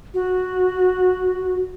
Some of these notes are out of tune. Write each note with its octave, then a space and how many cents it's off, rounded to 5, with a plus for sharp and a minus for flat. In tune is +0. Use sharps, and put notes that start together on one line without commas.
F#4 -5